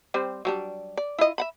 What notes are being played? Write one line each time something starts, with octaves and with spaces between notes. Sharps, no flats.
G3 C4 C5
F#3 G3 D4
D5
E4 F4 D#5
E5 F#5 B5